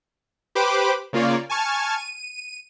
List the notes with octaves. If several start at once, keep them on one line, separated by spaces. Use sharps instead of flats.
G4 B4 C5 B5 D6
C#3 A#3 F4 C#5 D5
G#5 A5 C#6 F6 G#6
D#7